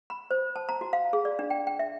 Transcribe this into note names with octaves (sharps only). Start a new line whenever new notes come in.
B5
C5
A5
A#5
F#4
F5
G#4
D5
D4
G5
G5
E5